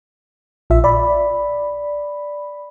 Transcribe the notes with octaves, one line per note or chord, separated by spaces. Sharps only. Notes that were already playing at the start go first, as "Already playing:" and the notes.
A#1 F4 E5
D5 B5